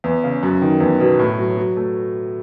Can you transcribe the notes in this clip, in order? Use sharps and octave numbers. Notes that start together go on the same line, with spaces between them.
E2
C#3
F#2
D#3
E2
B2
A2
F#3
F#3
A3